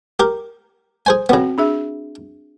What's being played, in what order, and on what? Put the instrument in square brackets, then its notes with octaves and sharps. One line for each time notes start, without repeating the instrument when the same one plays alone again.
[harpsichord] G4 A#4
G#4 C5 G#5
[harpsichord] C#3 B3 [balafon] C4 F#4 G5
[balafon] D4 G#4 E5